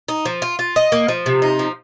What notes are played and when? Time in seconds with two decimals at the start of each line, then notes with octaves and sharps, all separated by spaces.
0.08 D#4
0.25 F3
0.42 F4
0.59 F4
0.76 D#5
0.92 A#3
1.08 F3
1.26 C3
1.42 D#4
1.59 F3